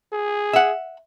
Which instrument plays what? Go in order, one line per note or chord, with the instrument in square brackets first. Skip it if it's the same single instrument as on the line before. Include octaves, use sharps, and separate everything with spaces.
[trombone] G#4
[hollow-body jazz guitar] E5 F#5